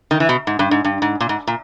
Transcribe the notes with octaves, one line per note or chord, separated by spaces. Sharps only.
D#3
E3
B2
G#2
G2
G#2
G2
G#2
A#2
G#2
A#2